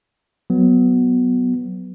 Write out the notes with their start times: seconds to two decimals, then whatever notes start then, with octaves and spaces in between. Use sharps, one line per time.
0.50 F#3 B3